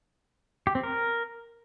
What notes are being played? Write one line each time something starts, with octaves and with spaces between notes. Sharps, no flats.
G4
C4
A#4